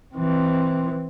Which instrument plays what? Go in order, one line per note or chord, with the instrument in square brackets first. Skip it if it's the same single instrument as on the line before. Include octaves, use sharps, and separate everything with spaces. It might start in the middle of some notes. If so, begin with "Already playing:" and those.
[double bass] E3 C4